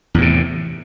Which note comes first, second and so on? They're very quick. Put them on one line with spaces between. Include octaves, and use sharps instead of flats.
E2 A2 C3